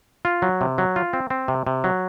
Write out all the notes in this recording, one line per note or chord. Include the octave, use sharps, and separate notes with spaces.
F4
F#3
C3
F#3
F4
C4
C4
C3
C3
F#3